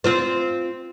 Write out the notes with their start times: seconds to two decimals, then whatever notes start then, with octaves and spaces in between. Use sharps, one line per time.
0.04 C4 F4 C5